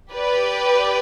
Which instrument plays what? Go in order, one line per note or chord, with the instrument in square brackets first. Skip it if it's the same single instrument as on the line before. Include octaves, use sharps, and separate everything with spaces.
[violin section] G4 B4 D5